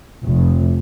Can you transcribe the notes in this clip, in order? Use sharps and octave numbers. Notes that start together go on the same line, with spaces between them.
F1